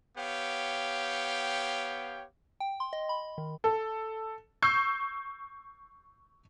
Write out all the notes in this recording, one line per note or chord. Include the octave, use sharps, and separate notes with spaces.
B3 G4 C#5 F5 G5
G5
C6
D#5
B5
D#3
A4
C#6 E6 G6 C7